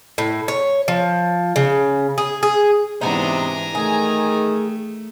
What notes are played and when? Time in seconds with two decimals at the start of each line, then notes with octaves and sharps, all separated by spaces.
0.18 A2
0.48 C#5
0.88 F3
1.56 C#3
2.18 G#4
2.43 G#4
3.01 G#2 C3 E3 B3 D4 D#4 G#5 A#5
3.75 D#3 A3 G#4